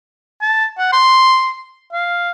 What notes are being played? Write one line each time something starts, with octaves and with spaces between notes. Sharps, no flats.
A5
F#5
C6
F5